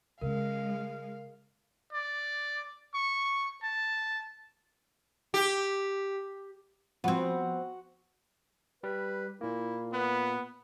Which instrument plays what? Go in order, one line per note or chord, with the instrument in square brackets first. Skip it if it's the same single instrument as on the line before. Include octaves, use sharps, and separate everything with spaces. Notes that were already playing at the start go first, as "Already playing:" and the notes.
[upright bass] C#3 C#4 [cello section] G#3 [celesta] A#4 [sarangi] F5
[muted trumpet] D5
C#6
A5
[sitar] G4
[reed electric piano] F3 [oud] B3 C4 [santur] F#4 F#5
[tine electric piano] G3 [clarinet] B4
[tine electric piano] A#2 A#3 [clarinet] E4
[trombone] B3 [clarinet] B4